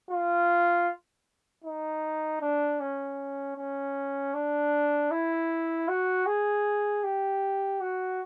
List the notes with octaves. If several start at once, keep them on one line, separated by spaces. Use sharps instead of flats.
F4
D#4
D4
C#4
C#4
D4
E4
F#4
G#4
G4
F#4